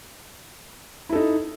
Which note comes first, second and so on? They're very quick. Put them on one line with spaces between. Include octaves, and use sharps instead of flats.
E4 A4 D#4